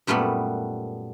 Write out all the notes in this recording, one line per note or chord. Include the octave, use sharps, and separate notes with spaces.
F#2 A#2 G3 A3 B3